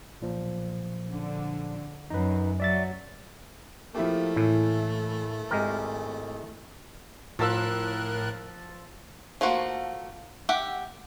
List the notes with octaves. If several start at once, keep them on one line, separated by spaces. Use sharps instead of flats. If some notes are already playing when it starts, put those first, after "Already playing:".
B1 A#2 F3
D3
F#2 D#4 B4
F#3 D5 E5 A6
F3 A3 A#3 E4 G4
A2 E3
G#1 G#3 G4 A#4
A2 F3 A#4 A5 E6 F#6
F3 A3 A#3 F#4
G4 E5 F#5